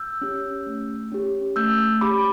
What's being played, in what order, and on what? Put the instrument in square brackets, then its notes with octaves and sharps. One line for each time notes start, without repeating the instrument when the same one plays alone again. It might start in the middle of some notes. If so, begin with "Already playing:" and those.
Already playing: [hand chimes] E6 G6
C#4 G4
A3
C#4 G4
A3 E6 G6
C#4 G4 B5 D6